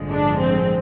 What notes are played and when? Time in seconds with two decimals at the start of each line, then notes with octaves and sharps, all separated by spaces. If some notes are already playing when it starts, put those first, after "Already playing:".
Already playing: A1 G2 D3 F3 G#3
0.11 D4
0.40 C4